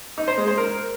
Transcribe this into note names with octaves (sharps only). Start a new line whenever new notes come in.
D#4
C5
G#3
C5
A#4